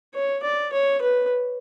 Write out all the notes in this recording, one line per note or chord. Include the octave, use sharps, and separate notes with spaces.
C#5
D5
C#5
B4